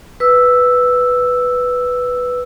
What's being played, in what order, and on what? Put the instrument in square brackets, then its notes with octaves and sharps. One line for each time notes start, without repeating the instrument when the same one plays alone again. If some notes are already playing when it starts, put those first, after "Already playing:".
[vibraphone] B4 E6